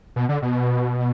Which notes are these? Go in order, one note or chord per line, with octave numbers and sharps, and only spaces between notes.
B2
D3
B2